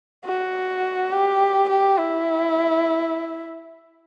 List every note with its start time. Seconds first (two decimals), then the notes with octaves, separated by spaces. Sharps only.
0.25 F#4
1.12 G4
1.69 G4
1.98 E4